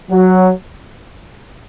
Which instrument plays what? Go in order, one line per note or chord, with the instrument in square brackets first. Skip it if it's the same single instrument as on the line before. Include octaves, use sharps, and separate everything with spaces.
[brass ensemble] F#3